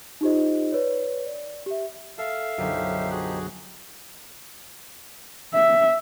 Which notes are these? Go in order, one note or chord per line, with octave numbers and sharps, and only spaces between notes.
D#4 F4 G4 C5 D#5
B4 C#5 D5
D5
G4 E5
A4 E5 F5
B1 F#2 D3 F3 D#4 G4
F#4 G#4 F#6
E5